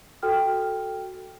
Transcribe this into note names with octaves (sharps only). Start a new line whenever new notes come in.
F#4 A4 G5 F6